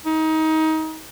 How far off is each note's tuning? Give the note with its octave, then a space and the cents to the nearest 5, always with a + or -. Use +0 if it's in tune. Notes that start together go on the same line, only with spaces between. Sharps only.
D#4 +25